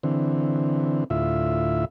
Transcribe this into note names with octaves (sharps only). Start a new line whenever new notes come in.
D3 E3 C4
D2 A2 E4 F4 E5